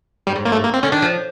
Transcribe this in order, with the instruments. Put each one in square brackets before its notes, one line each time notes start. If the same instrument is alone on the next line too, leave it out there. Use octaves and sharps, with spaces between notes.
[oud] G2 [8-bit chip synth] G3
[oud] G#2
[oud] G2 [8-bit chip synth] A#3
[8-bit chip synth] A3
[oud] G#2
[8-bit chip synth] A#3
C4
[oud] D3 [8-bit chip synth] C#4
[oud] D#3 [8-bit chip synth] D4
[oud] F3